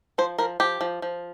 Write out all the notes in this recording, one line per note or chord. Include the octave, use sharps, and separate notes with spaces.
F3 C5
F3 A#4
F3 G4
F3
F3